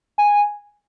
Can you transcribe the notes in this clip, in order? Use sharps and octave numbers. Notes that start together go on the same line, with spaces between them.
G#5